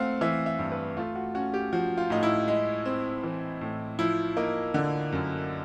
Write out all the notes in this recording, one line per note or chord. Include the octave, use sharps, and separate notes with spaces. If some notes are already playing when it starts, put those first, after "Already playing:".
Already playing: A3 C4 F5 F#5
E3 E5
E5
G2
B4
A3 F4
F#4
C#4 F#4
G4
F3 F#4
F4
A2 D#4
E4
G#3
C4
E3
A2
F3 E4
A#3 D#4
D3
F#2